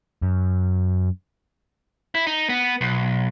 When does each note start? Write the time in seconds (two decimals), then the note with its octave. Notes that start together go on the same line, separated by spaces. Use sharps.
0.22 F#2
2.15 E4
2.27 D#4
2.49 B3
2.81 B1